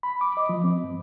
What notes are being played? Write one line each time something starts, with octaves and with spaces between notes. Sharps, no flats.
B5
D6
D#5
F3
C4
G2